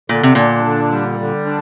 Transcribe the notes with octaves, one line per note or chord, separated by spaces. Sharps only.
A#2 D3
C3
A#2 D4
D3
G3
D3
D4